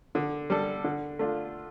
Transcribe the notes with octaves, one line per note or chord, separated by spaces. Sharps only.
D3
G3 D4 A4
D3
A3 D4 F4